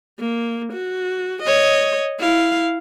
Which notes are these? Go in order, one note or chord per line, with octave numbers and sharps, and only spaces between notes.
A#3
F#4
C#5 D#5
E4 F5